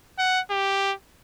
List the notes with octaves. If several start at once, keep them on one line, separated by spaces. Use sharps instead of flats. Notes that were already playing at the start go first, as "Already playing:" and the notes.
F#5
G4